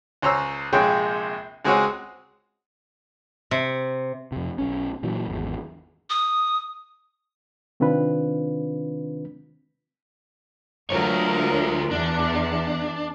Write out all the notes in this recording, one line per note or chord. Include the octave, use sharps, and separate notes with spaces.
C#2 C5 C#5 A#5 E6
A#1 C3 G#3 G#4 C#5 G5
C#2 G#3 C4 F#4 C#5 D#6
C3
F2 C3
B1 C#4
A#2 E3 F#3
G#1 E2
D#6
C3 D#3 C4 D4 F4 B4
D2 F#3 F4 A#4 C#5
E2 D4